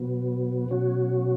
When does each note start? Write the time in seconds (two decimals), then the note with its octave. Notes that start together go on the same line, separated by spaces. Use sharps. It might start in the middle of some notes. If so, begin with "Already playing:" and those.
Already playing: B2 F#3 B3
0.69 B2 F#3 C#4 F#4